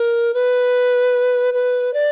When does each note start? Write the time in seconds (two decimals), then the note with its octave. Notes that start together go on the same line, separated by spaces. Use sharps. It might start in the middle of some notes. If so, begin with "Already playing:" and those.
Already playing: A#4
0.34 B4
1.54 B4
1.94 D5